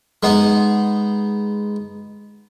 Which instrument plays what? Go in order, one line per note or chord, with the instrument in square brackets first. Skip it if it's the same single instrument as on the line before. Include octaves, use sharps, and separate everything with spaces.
[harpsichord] G#3 B3 D#4